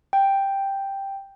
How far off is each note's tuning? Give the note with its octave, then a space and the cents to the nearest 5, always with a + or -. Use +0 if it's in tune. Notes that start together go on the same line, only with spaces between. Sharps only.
G5 +0